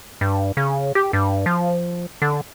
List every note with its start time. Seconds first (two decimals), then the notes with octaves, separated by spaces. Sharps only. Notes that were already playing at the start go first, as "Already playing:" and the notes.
0.21 G2
0.57 C#3
0.95 G4
1.13 G2
1.46 F3
2.22 D3